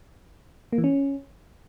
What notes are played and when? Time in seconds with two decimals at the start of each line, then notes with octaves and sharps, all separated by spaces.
0.73 A#3
0.78 E3
0.84 C#4